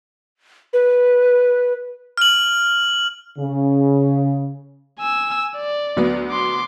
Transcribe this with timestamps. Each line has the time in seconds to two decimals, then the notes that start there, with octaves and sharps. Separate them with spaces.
0.73 B4
2.17 F6 F#7
3.38 C#3
4.99 G#5 E6
5.56 D5
5.97 D2 F#3 B3
6.30 C6 D6